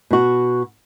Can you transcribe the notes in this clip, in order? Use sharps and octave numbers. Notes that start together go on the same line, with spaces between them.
B2 F#4